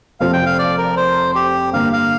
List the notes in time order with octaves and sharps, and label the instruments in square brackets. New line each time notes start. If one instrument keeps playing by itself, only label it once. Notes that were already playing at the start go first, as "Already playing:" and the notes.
[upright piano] F1 F2 F3 [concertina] F5
[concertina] G5
F5
D5
A#4
C5
G4
[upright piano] G2 D3 A#3 [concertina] F5
[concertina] F5